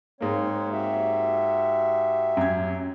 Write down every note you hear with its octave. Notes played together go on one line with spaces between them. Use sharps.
G#2 A#3 C4 C#5
F#4 G4 E5
F#2 G#6